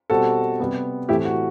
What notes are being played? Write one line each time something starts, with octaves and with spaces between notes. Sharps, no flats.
B2 G3 C4 F#4 A4
C3 G3 B3
A2 E3 A3 C4 E4 G4
F#4